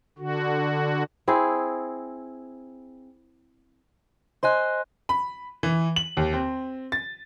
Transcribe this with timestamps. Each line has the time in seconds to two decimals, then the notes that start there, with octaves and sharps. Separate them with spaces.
0.18 D3 F#4
1.28 C4 E4 G#4
4.43 C5 D#5 G#5 C6 F#6
5.09 B5
5.63 E3
5.96 F#7
6.17 D#2
6.33 C4
6.92 A6